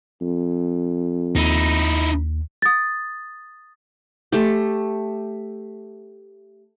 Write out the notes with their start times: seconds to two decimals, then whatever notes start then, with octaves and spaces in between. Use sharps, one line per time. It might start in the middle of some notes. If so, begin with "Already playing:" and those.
0.21 F2
1.35 D#2 D#4 E4
2.62 D#6 A6
4.32 A3 G4